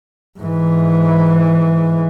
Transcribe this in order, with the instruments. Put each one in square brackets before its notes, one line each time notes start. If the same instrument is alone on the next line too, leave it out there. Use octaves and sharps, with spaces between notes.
[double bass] G#2 E3